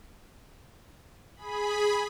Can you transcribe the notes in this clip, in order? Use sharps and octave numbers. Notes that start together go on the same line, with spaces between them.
G#4 B5